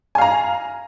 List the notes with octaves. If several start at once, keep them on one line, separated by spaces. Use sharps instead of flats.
F5 G#5 A#5